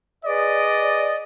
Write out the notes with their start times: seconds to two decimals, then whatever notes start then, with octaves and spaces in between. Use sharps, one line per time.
0.25 G#4 B4 D5 D#5